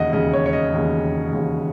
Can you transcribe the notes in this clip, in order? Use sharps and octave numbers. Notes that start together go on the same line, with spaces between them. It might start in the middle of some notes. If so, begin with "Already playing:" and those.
Already playing: E1 D#2 C#3 D#5 F#5
E1 D#2 C#3 D#5
C#5
C#5
D#5
E1 D#2 C#3
E1 D#2 C#3